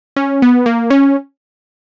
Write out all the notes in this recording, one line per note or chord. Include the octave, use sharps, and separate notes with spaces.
C#4
B3
A#3
C#4